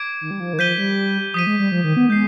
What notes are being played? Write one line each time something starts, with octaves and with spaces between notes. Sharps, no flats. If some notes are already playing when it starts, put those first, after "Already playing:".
Already playing: D6 G#6 D7
D#3
G3
F3
D#3
F3 G6 B6 D#7 G7
G3
F3 D#6 B6 D#7
G#3
G3
F3
D#3
B3
G#3 G6 C7